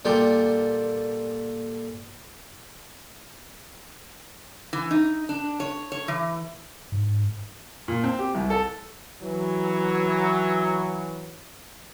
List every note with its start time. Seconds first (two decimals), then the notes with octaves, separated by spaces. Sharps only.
0.05 A#2 D3 G3 G5
4.73 E3
4.91 D#4
5.29 D4
5.60 C#5
5.92 C#5
6.08 E3
6.92 G#2
7.88 A#2
8.04 C4
8.19 G4
8.35 C2
8.50 A4
9.22 E3 F#3